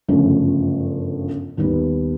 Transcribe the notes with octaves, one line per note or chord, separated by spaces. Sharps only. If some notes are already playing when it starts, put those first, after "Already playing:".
G1 F#2 C#3 F3 A3
D#2 D#3 G3 B3